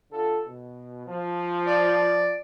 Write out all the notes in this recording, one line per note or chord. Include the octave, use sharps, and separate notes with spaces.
D3 F4 A4
B2
F3
D5